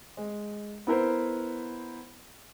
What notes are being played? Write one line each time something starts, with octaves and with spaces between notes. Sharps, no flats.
G#3
B3 E4 A#4 C5